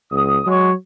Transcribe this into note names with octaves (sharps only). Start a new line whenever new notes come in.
C#2 D#6
F#3 G#3 C#5